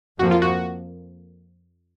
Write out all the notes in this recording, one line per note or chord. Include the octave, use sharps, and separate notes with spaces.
F2 F3 A#3 F#4
F4
F#4